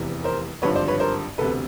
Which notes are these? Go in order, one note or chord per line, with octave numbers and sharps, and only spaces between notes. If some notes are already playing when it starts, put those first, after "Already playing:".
Already playing: F1 E2 C3 E3
A#4 C5
G#1 G2 D3 F3 B4 C#5
C5 D5
B4 C#5
A#4 C5
E1 D2 C3 A4 B4